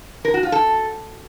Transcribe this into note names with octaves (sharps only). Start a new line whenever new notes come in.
A#4
F#4
F4
A4